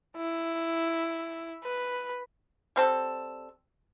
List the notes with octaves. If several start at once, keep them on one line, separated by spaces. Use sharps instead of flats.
E4
B4
G3 C4 A4